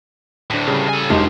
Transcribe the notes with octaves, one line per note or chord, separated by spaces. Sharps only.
D2 A2 D4 B6
C#3 G3
A4 G#5
E1 D4 D#4 F4 G4